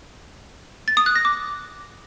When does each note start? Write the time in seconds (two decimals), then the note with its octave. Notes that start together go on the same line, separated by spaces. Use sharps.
0.88 A6
0.97 D#6
1.06 F#6
1.16 A#6
1.25 D6